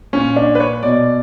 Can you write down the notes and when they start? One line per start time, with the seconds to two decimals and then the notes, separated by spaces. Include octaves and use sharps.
0.13 A#2 C#4
0.36 D4
0.55 B4
0.60 C#5
0.83 B2 D5